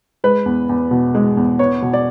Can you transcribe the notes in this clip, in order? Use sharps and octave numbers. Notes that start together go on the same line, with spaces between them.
G#3 B4
E2
E2
B2
G#3
E2
B3 C#5
B2
D5